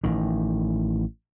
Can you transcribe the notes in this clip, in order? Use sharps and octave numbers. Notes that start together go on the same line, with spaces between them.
A1 D#3